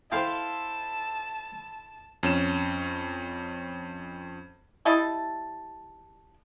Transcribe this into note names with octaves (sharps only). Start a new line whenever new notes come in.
E4 A4 C5 F5 G5 A5 C6
F2 C#4 E7
G3 E4 D#5 A5